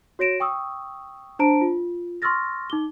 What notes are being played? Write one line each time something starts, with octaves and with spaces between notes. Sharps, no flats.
F#4 C#5 A#6 D7 E7
G5 C#6 D#6 E6
D4 C5 A5 A#5 D7
F4
C6 C#6 E6 F6 A6 A#6
D#4 D6 G7